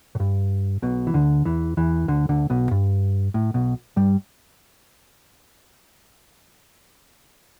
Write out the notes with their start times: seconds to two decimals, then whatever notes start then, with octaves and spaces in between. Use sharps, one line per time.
0.15 A2
0.20 G2
0.82 B1 B2
1.07 E3
1.14 D2 D3
1.45 E2 E3
1.77 E2 E3
2.08 D2 D3
2.29 D2 D3
2.50 B1 B2
2.71 G2
3.34 A2
3.54 B1 B2
3.96 G2 G3